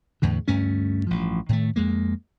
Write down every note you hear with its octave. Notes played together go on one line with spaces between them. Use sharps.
E2 A2 D3
D2 G2 A3 C#4
A1 G2 F3
A2 D#3 A3
F2 G#3 A#3